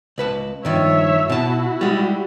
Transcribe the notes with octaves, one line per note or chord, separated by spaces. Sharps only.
C#2 B4 A5
G2 D#3 F3 C#5 E5
B2 E4 F#4 A5
G3 G#3